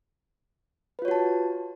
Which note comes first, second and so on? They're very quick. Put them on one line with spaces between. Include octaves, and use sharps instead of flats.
B4 F4 C#5 F#4 A5